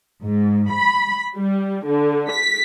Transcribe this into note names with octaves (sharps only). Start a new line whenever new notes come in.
G#2
B5
G3
D3
B6